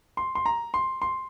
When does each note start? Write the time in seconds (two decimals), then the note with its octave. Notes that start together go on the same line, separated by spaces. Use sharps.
0.17 C6
0.35 C6
0.46 A#5
0.74 C6
1.02 C6